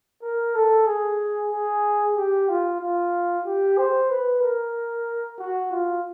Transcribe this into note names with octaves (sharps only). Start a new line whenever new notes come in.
A#4
A4
G#4
G#4
G4
F4
F4
G4
C5
B4
A#4
F#4
F4